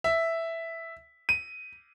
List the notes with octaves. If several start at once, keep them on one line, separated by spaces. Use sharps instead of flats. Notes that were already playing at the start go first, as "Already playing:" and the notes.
E5
D#7